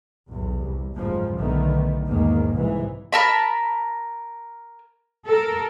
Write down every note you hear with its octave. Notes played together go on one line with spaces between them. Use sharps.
B1 E2
C2
F#1 D#2 G#2 C#3 F3
B1 D3 D#3 A3 B3
E2 G#2 D#3 A#3
C2 G#2 E3
A#4 A5 B5
A4 A#4